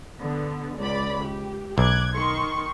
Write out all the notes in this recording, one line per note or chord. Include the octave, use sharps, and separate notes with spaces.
D3 B3
C#2 D5 B5
G4
B1 D6 F#6 G#6
D#3 C6 C#6